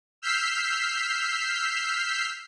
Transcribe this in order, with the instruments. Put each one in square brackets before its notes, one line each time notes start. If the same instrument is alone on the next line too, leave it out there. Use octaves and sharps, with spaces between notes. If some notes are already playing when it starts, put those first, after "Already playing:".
[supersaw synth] E6 F6 G6 B6 C7